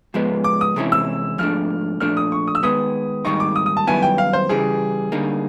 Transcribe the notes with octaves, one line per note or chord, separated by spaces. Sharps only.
G#2 F3 G#3 B3
D6
D#6
C3 E3 G#3 C#4 E4
E6
G#2 F3 A3 D4 F6
A#2 F3 A3 D4 F6
D#6
C#6
D#6
E6
D#3 G#3 B3 D#6
G#2 D#3 G3 A#3 D#4 C#6
D6
D#6
D#6
A5
F#2 D#3 G3 B3 E4 G#5
G5
F5
C5
C#3 E3 G3 G#4
D3 G3 A#3 D#4